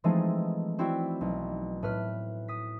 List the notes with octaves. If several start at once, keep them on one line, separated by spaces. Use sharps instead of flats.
E3 F3 G#3 A3 C4 D#4
C4 E4 F#4 D5 G5
B1
A2 B4 F6
D#6 B6